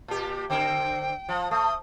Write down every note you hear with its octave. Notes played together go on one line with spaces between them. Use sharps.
A#2 G4
D3 C4 G5
F3
A3 D#6